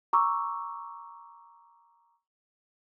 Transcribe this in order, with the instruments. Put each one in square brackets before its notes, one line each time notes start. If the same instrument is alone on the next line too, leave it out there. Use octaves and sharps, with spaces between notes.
[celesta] A#5 C#6 D6 E6